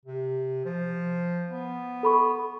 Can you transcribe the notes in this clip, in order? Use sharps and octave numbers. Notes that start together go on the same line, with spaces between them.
C3
F3
B3
A4 B5 C#6